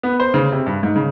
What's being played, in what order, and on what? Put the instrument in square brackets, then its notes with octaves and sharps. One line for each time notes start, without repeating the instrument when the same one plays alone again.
[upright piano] B3
C5
C#3
C3
G2
G#2
C#3